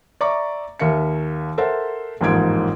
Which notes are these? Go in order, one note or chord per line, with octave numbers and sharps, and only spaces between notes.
D5 E5 A#5 C#6 D6
D#2 A#4 E5 C#7
A4 A#4 C5 E5 F#5
A1 F2 G#2 A#3 G#6 D7